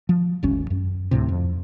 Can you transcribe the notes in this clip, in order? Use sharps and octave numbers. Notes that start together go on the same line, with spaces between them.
F3
D#1 G#1 C#4
F#2
D1 D2 A2 C3
F2